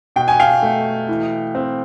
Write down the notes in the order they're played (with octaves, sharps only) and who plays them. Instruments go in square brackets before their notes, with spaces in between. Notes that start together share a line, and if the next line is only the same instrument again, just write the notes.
[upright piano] B2 G5
G#5
F5 G5
A3
E3
C4